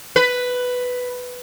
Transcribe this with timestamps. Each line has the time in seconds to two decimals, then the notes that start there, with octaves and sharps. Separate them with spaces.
0.16 B4